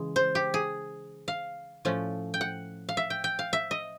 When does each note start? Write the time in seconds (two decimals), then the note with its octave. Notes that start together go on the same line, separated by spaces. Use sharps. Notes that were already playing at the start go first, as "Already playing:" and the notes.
Already playing: C#3 E3 G#3
0.16 C5
0.35 G4
0.54 G#4
1.28 F5
1.85 A2 F3 A3 C#4
2.34 G5
2.41 F#5
2.89 F5
2.97 E5
3.10 G5
3.24 G5
3.39 F5
3.53 E5
3.71 D#5